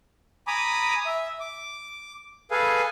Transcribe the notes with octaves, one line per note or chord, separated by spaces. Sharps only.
G#5 A#5 B5 D6 D#6
E5
D6
G#4 A4 B4 F5 G#5